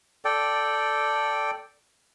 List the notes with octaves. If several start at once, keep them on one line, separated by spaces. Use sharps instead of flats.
A4 D5 G5